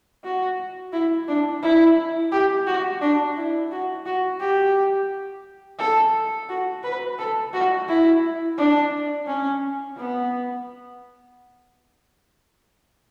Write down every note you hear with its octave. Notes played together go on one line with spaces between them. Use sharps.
F#4
E4
D4
E4
G4
F#4
D4
E4
F#4
F#4
G4
A4
F#4
B4
A4
F#4
E4
D4
C#4
B3